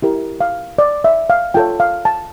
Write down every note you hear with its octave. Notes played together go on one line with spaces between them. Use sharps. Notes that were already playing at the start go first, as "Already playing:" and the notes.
E4 G4 A#4
F5
D5
E5
F5
F4 A4 C#5 G5
F5
A5